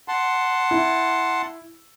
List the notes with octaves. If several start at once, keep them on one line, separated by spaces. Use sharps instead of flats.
F#5 A5 C6
E4